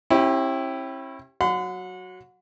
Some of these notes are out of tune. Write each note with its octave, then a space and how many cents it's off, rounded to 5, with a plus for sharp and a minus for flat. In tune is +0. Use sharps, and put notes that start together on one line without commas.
C#4 -45 E4 +0 G4 +0
F#3 +0 F#5 -30 C6 -45